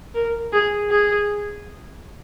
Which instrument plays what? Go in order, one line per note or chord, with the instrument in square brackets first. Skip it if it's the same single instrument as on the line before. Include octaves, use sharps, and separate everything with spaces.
[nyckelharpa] A#4
G#4
G#4